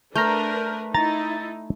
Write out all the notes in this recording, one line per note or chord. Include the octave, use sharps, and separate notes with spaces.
A3 D4 A#4 B4 A#5 F6 G6
D#4 E4 A#5 A6